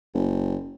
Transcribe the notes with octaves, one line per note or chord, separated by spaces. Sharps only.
F#1